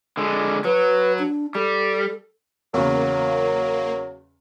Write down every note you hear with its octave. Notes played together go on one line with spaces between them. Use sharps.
D3 G#3
F#3 B4
D4
G3 A4
E2 C#3 F#3 A#3